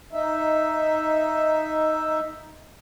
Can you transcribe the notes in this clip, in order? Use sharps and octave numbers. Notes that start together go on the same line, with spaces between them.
D#4 E5